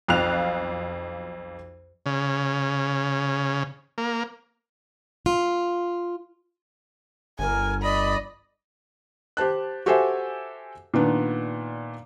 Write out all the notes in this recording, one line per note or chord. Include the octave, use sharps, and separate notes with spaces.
B1 F2 F4 F5 F#6 F7
C#3
A#3
F4
G1 A#4 G#5
D5 D#5 B5
G4 C5 A5 F#6
F#4 G4 A4 C5 E5 G#5
A#2 D#3 B3 D4